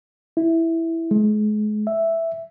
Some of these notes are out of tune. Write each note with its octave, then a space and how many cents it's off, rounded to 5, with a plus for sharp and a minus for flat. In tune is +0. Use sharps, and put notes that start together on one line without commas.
E4 +0
G#3 +35
E5 +0